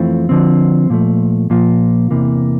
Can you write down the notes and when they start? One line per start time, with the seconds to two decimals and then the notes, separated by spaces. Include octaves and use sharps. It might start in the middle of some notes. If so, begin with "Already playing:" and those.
Already playing: F2 E3 A3 C4 F4
0.29 D3 F3 C4
0.90 A#2 F3 A3
1.50 A#2 F3 A#3 F4
2.11 E2 C3 E3 A#3